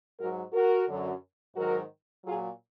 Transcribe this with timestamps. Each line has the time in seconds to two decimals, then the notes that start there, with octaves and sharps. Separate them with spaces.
0.19 G#2 F#3 F#4 A#4
0.53 F#4 A#4
0.88 F#2 D3 F#3
1.56 G#2 D#3 F#3 F#4 A#4
2.25 A#2 F#3 F4 G#4